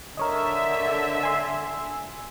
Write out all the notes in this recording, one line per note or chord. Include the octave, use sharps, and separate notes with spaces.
D3 A#4 C#5 D#5 E5
G#5 C6 E6